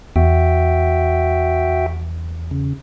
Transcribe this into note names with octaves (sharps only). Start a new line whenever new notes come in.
E2 F#4 E5 G5
C#3